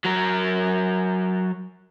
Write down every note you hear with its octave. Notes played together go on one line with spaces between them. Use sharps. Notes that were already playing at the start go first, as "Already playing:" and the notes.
F#3 A#4